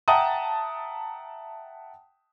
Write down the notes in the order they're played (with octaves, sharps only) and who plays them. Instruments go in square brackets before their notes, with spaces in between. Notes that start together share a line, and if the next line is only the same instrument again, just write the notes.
[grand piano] E5 F#5 G5 A5 A#5 D#6